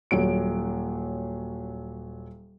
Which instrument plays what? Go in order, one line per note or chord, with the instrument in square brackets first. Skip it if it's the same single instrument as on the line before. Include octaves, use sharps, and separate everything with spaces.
[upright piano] D#1 F#3 D7